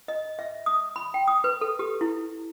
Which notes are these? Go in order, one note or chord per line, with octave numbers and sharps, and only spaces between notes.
D#5
E5
D#6
B5
G5
D#6
B4
A4
G4
E4